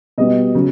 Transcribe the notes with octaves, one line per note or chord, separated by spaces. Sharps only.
B2 G3 B3 D#5
C#3 F#3